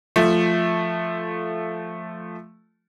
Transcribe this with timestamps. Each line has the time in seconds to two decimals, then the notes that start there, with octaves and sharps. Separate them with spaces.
0.16 F3 A3